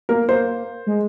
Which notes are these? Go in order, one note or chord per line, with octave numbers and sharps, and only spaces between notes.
A#3 A#4
C5
G#3